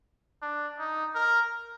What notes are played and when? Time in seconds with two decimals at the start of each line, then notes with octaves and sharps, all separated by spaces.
0.42 D4
0.79 D#4
1.15 A#4